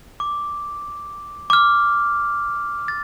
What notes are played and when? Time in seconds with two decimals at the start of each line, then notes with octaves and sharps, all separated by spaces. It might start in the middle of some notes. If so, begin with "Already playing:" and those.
0.20 D6
1.50 D6
1.53 F6
2.88 A6